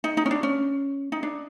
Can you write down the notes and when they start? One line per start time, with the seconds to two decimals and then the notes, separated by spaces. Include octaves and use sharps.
0.04 D#4
0.17 D#4
0.26 C#4
0.31 D4
0.43 C#4
1.12 D#4
1.23 D4